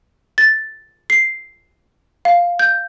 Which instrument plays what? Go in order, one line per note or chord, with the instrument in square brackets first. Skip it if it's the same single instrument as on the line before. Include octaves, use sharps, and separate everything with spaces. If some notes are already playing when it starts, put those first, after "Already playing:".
[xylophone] A6
C7
F5
G6